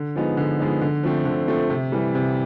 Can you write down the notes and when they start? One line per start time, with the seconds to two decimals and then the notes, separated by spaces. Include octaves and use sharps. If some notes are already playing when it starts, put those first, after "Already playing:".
Already playing: D3
0.16 F3 G#3 B3 D#4
0.37 D3
0.60 F3 G#3 B3 D#4
0.81 D3
1.03 F3 A3 C4
1.25 D3
1.48 F3 A3 C4
1.70 C3
1.92 E3 G3
2.15 C3